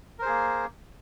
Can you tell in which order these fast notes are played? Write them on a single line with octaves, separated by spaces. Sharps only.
A#4 C5 G#4 A#3